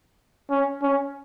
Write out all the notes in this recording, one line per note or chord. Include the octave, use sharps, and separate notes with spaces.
C#4
C#4